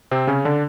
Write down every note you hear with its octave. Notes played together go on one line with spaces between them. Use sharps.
C3 C4
C#3 C#4
D3 D4